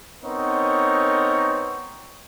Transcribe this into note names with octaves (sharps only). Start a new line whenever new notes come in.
B3 C4 D#4 A#4 C#5